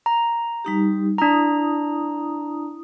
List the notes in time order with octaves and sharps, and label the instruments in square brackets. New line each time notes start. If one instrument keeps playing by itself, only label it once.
[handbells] A#5
[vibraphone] G3 D#4 G4
[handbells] D4 A#5 [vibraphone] E4 D#6